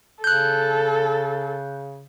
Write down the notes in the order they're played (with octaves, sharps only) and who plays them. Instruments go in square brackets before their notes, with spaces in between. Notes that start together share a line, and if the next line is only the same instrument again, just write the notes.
[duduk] C#3 [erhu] A4 [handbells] F#6 G6